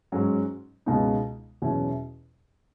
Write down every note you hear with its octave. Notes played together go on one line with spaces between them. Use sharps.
G#2 F#3 C#4
C#2 B2 G#3 B3 D#4
E2 B2 F#3 C#4 E4